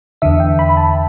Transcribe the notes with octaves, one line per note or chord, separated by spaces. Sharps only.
E2 D3 E5
G5
B5
B5
A5